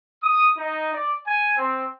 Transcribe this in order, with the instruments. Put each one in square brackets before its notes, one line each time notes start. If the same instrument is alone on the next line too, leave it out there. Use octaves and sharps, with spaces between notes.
[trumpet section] D#6
D#4
D5
G#5
C4